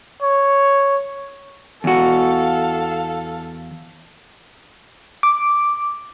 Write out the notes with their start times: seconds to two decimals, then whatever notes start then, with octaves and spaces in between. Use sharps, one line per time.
0.22 C#5
1.84 E2 F#4 A4 F5
5.23 D6